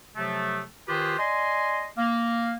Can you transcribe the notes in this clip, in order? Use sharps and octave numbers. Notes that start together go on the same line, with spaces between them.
C3 F3 F#3 A3
D#3 F4 G4 G#4 B4 C5
D5 D#5 G#5 C6
A#3 F5